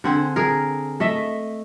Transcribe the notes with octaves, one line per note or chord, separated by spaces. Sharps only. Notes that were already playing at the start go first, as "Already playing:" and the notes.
D3 C4 G#4
G#4 A#4
A3 D#5 E5